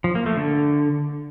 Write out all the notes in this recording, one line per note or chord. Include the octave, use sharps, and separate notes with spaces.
F3
A#3
A3
D3